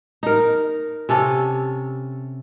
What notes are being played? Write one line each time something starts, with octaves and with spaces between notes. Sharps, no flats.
D#4 A#4
C3 C#4 A4